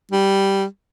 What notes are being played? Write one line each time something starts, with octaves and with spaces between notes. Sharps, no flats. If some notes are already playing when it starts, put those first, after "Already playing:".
G3